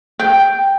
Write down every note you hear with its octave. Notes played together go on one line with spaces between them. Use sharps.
G5